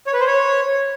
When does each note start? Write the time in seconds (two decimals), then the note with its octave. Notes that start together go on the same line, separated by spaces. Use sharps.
0.07 C#5
0.13 B4
0.20 C5
0.26 C#5